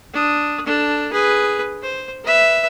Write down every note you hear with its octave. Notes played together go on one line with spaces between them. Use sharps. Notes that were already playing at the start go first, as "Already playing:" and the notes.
D4 D#6
D4 A4
G#4 B4
C5
B4 E5